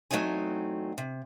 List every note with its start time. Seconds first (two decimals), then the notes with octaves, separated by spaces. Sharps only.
0.11 E2 F#3 A3 C4 D#4 G#5
0.98 C3